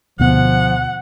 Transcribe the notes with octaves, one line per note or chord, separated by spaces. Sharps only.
D2 B2 F3 B3 F#5